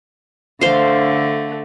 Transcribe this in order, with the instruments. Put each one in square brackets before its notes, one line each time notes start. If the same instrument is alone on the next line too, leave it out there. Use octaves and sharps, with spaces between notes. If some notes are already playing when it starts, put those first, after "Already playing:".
[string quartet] D3 A3 [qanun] C5 F5